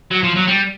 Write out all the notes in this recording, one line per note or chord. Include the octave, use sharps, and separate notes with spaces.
F#3
F3
F#3
G3